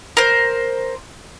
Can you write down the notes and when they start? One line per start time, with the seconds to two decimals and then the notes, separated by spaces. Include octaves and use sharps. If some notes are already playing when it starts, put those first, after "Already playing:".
0.17 A#4 C5